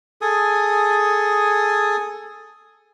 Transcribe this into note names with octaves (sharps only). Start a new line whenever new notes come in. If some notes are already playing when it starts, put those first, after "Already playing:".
G#4 A4 G#5 D#6